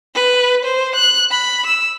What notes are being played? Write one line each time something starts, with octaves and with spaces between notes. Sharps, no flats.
B4
C5
F#6
B5
E6